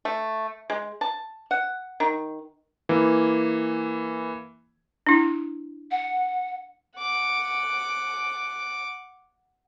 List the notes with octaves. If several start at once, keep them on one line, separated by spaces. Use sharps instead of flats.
A3
G#3
A5
F#5
D#3
E3 A#3
D4 E4
F#5
F#5 D6